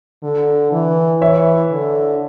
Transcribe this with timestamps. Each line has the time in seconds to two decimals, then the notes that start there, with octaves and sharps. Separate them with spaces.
0.23 D3
0.72 E3
1.21 E3 C#5 E5
1.71 D3